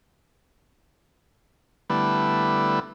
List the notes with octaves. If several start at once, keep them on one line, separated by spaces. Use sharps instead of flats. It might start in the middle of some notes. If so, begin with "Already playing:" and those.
D3 G3 A3 B3 E4 B4